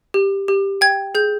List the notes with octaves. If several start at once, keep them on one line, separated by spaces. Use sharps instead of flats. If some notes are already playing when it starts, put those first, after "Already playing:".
G4
G4
G5 G#6
G#4 G6